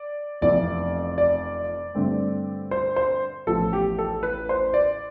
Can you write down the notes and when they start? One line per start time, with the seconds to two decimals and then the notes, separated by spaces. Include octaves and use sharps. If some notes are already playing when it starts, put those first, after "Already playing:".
Already playing: D5
0.41 F1 F2 E3 B3 D5
1.18 D5
1.95 G2 D3 A3 C4
2.71 C5
2.96 C5
3.47 A1 A2 F3 B3 A4
3.73 G4
3.99 A4
4.23 B4
4.49 C5
4.74 D5